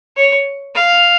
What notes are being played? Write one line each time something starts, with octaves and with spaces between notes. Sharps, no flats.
C#5
F5